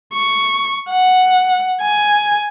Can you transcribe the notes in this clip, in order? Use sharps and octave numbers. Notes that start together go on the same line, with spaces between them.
C#6
F#5
G#5